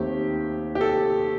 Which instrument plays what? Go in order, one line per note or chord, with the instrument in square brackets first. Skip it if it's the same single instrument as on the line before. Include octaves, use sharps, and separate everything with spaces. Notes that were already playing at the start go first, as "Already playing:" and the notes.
Already playing: [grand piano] D#2 D#3 A3 C4 G4
G4
A4